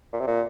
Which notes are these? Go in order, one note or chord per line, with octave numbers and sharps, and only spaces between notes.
A#2
C3
A#2